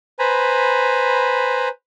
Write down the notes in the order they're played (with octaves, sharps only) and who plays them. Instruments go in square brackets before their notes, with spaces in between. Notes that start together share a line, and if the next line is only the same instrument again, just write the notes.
[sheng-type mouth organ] B4 C5 G#5 A#5 B5